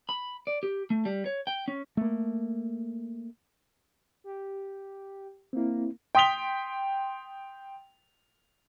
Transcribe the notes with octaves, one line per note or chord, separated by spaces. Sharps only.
B5
D5
G4
A3
G3
C#5
G5
C#4
A3 A#3
G4
A#3 C4 E4
G5 C6 D#6 B6 F7 G7